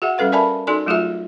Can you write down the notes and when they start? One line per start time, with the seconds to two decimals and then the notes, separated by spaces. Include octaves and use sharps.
0.02 F#4 G#4 E5 F#5
0.18 G3 C#4 A4 B4 F5
0.32 A#4 D5 E5 G#5 A5 B5
0.67 D#4 F#4 A4 D5 G#5 C6
0.86 F#3 A3 F4 F#4 G#4 E5